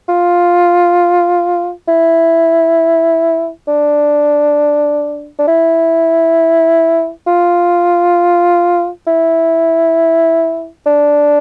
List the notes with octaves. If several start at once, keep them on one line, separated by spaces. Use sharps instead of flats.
F4
E4
D4
D4
E4
F4
E4
D4